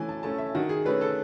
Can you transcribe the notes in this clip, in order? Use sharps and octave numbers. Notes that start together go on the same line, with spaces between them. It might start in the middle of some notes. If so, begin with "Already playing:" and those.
Already playing: E3 A3 C#4 G#5
A5
A3 C#4 A5
E5
D#3 F#4
G#4
A3 C#4 B4
A4